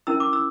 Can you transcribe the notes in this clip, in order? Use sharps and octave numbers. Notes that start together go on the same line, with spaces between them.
C#4 E4 A#4 E6
D6
E6